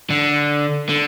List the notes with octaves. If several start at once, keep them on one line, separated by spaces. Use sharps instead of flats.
D3
D3